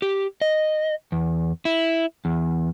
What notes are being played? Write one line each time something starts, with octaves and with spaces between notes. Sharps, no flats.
G4
D#5
E2
E4
E2